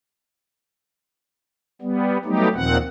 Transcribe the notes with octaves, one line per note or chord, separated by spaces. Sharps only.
G3 B3
F#3 G3 A3 B3 D#4 G4
D#2 A#2 D#3 F3 C4 F#5